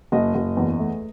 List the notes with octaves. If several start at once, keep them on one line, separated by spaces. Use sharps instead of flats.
F#1 D#5
F#1
E2
A3